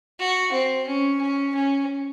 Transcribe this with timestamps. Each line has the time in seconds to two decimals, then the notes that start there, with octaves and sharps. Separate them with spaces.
0.19 F#4
0.52 C4
0.87 C#4
1.21 C#4
1.55 C#4